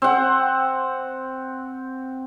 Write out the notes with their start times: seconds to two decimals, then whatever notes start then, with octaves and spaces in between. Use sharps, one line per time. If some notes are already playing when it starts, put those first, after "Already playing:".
0.02 C4 F#5